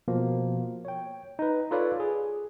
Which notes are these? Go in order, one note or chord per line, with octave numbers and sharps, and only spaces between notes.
B2 F3 A#3
C#5 G5
D#4 B4
F4 A4 B4 C#5 D5 F5
G#4